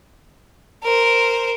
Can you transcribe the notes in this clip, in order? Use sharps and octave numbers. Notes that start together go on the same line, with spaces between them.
A#4 C5